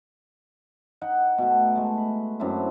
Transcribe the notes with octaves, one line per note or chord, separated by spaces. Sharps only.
D#4 F#5 G5
B2 A3
G#3 A3
B5
F#2 C4 D4 E4